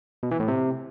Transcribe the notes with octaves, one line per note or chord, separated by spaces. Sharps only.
B2
E3
A2
C3